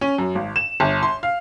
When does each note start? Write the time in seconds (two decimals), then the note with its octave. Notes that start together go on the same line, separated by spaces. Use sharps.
0.01 C#4
0.18 F#2
0.35 G#1
0.56 E7
0.80 G1
1.03 C6
1.23 F5